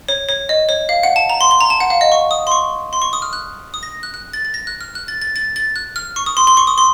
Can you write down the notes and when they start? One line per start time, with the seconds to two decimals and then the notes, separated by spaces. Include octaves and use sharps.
0.09 C#5
0.29 C#5
0.49 D#5
0.69 C#5
0.89 F5
1.03 F#5
1.16 A5
1.29 A#5
1.41 C6
1.51 C6
1.61 A#5
1.70 A5
1.80 F#5
1.90 F5
2.01 D#5
2.12 C#6
2.31 D#6
2.47 C6
2.52 C#6
2.93 C6
3.02 C#6
3.13 D#6
3.22 F6
3.33 F#6
3.74 D#6
3.83 A#6
4.03 F#6
4.14 F#6
4.33 A6
4.45 A6
4.54 A#6
4.67 F#6
4.81 F6
4.95 F#6
5.08 A6
5.22 A6
5.36 A6
5.56 A6
5.76 F#6
5.96 F6
6.16 C#6
6.26 D#6
6.37 C6
6.47 C6
6.57 C#6
6.67 D#6
6.78 C6